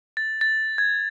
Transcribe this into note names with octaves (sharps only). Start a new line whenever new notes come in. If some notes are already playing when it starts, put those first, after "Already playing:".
A6
A6
G#6